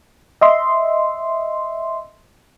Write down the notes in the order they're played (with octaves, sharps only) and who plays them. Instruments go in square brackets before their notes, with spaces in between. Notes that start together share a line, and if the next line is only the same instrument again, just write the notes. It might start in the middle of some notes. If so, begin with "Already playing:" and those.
[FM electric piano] D#5 E5 C6